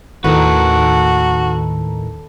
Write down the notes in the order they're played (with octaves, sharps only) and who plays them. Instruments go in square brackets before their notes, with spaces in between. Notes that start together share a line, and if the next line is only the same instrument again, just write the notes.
[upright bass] D#2 [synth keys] A2 D#3 A#5 [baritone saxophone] F#4 [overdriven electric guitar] A4 B4